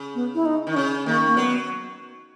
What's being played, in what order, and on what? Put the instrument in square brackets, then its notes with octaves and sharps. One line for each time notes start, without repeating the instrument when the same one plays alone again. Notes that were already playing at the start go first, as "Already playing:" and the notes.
Already playing: [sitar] C#3
[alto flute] B3
E4
D#4
[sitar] D#3 [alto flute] D#4
[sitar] C#3 [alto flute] C#4
[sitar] D#3 [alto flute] A#3
[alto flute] A#3
[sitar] F#3 [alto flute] B3